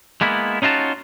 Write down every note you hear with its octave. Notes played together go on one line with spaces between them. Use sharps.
G#3 A#3 B3 E4
C#4 D#4 F4 F#4 A5